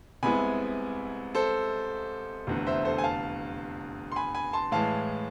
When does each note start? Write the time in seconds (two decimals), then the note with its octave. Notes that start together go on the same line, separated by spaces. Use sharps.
0.23 C2 C3 G#3 B3 E4 G#5 B5
1.35 A4 C5
2.47 F1 E2 D3
2.66 C5 E5
2.85 A4 C5
2.98 G#5
3.04 F5 A5
4.12 C6
4.16 G#5 B5
4.35 G#5 B5
4.53 A5 C6
4.72 A2 E3 G#3 F5 A5